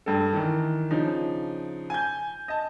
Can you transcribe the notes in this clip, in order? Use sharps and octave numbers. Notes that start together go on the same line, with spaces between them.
G2 D4 A4
D#3 E3
C#3 F3 D4 D#4
G#5 G6
D#5 A5